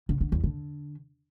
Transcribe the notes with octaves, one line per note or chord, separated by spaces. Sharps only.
D3
D3
E2
D3